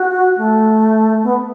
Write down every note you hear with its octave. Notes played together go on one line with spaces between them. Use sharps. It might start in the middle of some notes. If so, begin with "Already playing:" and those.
Already playing: F#4
A3
B3